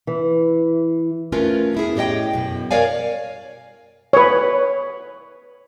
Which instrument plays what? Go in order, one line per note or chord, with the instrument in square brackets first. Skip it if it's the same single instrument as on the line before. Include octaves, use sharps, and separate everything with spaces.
[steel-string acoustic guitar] E3
[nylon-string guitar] A3 C#4 F4 A#4 B4
B3 E4 G#4
A2 G4 C#5 D#5 G5
F#2 B2
A#4 C#5 D5 F5 G#5
[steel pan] B4 C#5